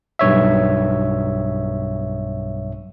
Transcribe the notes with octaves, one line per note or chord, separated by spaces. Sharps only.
B1 G2 C#5 E5